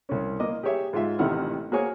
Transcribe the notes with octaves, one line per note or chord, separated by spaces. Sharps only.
C2 C#4
A#3 D#5 D6
G4 G#4 C#5 E5
G#2 F4 E5
A1 C3 D#3 E4 F#5 F6
A#3 F#4 G#4 C5 C#5 G#5